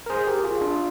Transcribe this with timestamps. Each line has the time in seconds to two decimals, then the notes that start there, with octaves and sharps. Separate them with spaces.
0.06 A#4
0.10 G#4 C5
0.27 G4 A#4
0.44 F4 G#4
0.61 D4 F4